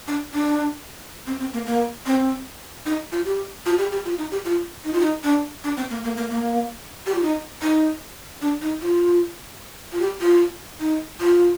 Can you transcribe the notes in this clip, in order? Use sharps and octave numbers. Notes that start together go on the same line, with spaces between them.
D4
D4
C4
C4
A#3
A#3
C4
D#4
F4
G4
F4
G4
G4
F4
D#4
G4
F4
D#4
F4
D#4
D4
D4
C4
A#3
A#3
A#3
A#3
G4
F4
D#4
D#4
D4
D#4
F4
F4
G4
F4
D#4
F4